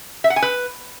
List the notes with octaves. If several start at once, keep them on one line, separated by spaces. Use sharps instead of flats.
E5
F#5
G#5
B4